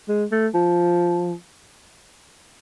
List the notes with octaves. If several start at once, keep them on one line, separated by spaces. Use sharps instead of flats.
G#3
A3
F3